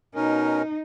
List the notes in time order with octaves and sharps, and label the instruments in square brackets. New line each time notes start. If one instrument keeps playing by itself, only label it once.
[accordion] B2 C#4 A#4 [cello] D#4